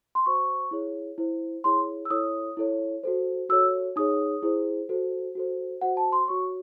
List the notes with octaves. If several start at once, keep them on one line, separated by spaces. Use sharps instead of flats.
C6
F#4 C5 C#6
E4 G#4 C#5
E4 C5
E4 G#4 C#5 C6
E6
E4 A4 C#5 D#6
E4 A4 C#5
F#4 A4 C5
F#4 A4 C#5 E6
D#4 G#4 C#5 D#6
E4 G#4 C5
F#4 A4 C5
F#4 A4 C5
F#4 C5 F#5
A5
C6
F#4 C#5 C#6